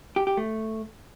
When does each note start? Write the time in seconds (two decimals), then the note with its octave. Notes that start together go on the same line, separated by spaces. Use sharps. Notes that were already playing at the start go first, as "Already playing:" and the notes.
0.16 G4
0.27 G4
0.37 A3